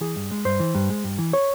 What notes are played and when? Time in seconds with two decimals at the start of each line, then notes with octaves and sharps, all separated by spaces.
0.01 E3 G#4
0.16 G2
0.31 G#3
0.45 G2 C5
0.60 E3
0.75 G2
0.90 G#3
1.04 G2
1.18 E3
1.33 C#5